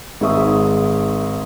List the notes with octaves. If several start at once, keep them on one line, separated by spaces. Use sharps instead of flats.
G#1 G#2 G#4 E5 C#6 D#6